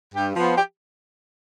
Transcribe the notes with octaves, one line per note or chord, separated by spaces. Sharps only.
G2 G4
F3 B3
G4